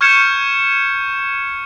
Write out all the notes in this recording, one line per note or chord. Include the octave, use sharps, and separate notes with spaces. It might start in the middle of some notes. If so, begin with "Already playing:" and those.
C#6 F6 G6 G#6 C#7 E7